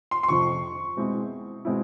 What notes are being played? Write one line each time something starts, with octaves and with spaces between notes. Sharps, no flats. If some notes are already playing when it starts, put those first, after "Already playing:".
C6
C6
F2 C3 F3 C#6
B2 G#3 C4 E4
B2 G#3 C4 E4